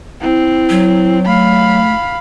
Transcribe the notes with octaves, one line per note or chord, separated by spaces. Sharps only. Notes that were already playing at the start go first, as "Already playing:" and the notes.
C4 E4
F#3
A3 F5 B5